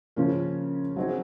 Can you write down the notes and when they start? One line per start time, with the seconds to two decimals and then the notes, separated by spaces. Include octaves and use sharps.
0.16 C#3 F3 A#3 C#4 F4
0.96 F#3 C4 D#4 G#4